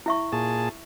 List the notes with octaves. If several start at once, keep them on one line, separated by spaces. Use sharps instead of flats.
E4 E5 C#6
A#2 G#4 A5